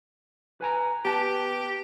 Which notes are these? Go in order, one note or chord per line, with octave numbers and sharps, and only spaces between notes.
B4 G#5 A#5
B3 G4 A5